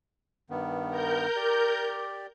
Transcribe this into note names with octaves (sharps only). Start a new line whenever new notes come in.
G2 D#3 B3
A#4 G6
G4 D5